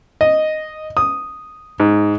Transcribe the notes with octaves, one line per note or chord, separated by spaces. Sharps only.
D#5
D#6
G#2